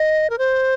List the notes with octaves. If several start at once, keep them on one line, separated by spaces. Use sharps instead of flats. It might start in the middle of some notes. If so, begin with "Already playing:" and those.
Already playing: D#5
A#4
C5